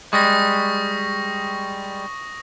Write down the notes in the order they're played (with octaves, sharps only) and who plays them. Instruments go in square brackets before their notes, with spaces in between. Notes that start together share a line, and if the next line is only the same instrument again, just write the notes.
[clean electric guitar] G3 G#3 [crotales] C#6 D#6 A#6